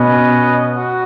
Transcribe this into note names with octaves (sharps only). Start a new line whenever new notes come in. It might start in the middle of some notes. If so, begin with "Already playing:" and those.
Already playing: B2 C#4 B4 D#5
F#4